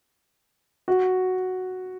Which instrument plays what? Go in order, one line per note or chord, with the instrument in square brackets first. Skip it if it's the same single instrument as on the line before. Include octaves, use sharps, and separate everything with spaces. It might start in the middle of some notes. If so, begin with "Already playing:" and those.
[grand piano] F#4